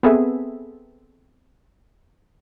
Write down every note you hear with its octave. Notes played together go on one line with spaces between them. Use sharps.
B3 C4 G#4 A4 B4 E5